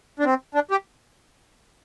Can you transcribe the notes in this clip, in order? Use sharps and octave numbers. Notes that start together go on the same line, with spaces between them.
D4
C4
D4
G4